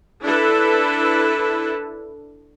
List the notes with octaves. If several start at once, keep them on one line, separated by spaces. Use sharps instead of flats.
D4 E4 A4 B4